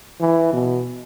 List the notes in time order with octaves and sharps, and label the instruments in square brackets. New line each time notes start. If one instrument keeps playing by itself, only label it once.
[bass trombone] E3
B2